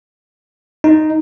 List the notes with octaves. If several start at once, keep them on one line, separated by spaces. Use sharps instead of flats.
D#4